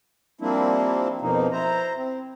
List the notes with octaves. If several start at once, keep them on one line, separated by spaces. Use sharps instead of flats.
F3 G3 A#3 C4 D4 E4
F2 B2 F3 A#3 D#4
E4 C5 A#5
C4